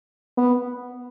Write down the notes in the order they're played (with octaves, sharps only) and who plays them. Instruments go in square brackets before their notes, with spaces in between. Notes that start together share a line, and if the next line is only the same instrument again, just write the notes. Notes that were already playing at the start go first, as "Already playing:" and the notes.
[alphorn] B3